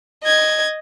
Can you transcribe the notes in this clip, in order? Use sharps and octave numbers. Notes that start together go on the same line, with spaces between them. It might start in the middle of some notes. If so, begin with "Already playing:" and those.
D#5 G#6